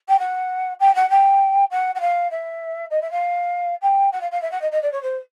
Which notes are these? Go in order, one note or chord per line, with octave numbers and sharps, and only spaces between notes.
G5
F#5
G5
F#5
G5
F#5
F#5
F5
E5
D#5
E5
F5
G5
F#5
F5
F5
E5
F#5
D#5
D#5
D5
C#5
C5